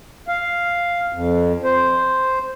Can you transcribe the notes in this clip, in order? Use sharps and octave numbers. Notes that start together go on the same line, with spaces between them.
F5
F2
C5